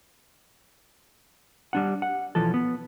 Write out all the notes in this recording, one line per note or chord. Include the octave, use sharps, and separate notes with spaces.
G3 D4 F#5
F#5
B1 E3 F3 A4
B3